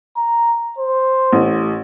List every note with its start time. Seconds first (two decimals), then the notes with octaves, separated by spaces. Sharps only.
0.17 A#5
0.79 C5
1.33 A1